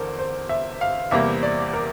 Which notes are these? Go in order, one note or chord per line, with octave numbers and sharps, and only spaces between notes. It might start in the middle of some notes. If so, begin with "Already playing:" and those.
Already playing: E2 D3 A4 A#4 C5
C5
E5
F5
E2 C3 G3 A#3 E5
D5
A#4